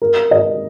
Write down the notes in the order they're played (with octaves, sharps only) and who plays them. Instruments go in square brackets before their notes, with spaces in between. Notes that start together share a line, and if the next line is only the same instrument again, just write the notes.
[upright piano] A#4
D#5